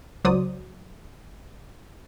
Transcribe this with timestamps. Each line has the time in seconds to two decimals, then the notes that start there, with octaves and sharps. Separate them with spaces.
0.24 C#2 F#3 C5 D5 D#6